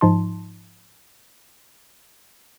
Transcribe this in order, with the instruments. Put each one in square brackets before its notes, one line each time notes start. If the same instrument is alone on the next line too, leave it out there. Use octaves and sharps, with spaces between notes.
[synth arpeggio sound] G#2 F3 D#4 A5 C6